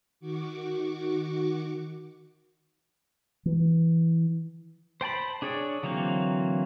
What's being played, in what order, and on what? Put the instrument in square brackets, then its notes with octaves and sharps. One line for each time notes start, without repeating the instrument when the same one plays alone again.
[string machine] D#3 F#4 C#6 D6
[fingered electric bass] E3
[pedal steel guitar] C5 G5 A5 B5
D4 G#4 C#5 D5
D3 E3 F#3 A#3 C4